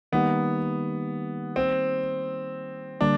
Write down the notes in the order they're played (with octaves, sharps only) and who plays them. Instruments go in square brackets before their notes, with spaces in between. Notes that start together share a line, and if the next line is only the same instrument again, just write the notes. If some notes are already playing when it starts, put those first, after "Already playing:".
[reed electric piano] D#3 G3 A#3 D#4 G4 [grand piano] B3
[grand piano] C4
[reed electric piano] D3 G3 A#3 [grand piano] D4